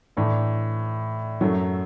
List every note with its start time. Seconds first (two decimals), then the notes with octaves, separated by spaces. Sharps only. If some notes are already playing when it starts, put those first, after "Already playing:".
0.17 A2 E3 A3 D4
1.41 F#2 F#3 A3